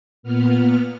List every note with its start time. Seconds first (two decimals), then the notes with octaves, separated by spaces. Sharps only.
0.23 A#2 B3 F6